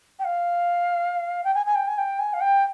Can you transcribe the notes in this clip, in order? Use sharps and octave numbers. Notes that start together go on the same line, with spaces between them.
G5
F5
G5
G#5
G#5
G5
G#5
G5
G#5
F5
G5